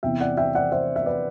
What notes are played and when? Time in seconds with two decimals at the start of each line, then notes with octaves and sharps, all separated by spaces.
0.03 E2 C3 E3 E5 G5
0.21 D5 F#5
0.37 E5 G5
0.55 D5 F#5
0.72 C5 E5
0.96 E5
1.06 B4 D5